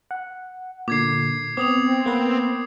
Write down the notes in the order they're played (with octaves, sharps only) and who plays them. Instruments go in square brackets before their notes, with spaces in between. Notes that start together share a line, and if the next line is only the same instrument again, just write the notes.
[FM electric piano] F#5
[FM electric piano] A#2 D3 [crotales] D6 G#6 C7
[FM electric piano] B3 [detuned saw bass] C4 [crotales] D6 D#6 F7
[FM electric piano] A#3 B3 B4